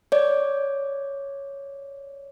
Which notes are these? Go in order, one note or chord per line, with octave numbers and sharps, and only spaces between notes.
C#5 D5